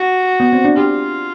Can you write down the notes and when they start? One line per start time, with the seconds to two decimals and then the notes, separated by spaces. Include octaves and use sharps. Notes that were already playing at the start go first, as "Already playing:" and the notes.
Already playing: F#4
0.40 B3
0.53 C4
0.65 D4
0.77 F4 G4